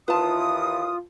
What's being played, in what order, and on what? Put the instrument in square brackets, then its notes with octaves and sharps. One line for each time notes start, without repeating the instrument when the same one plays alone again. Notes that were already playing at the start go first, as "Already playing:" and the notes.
[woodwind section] D#2 E3 D#6 [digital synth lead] F4 [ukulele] B4 A5